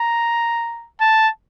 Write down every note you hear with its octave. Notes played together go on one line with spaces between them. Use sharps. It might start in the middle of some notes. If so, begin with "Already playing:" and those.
Already playing: A#5
A5